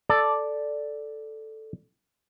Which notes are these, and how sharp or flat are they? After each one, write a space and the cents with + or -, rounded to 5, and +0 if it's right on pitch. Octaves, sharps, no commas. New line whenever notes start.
A4 +0 D5 +0